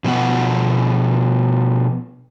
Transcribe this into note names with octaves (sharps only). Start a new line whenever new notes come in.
B2 F3 B3 F#5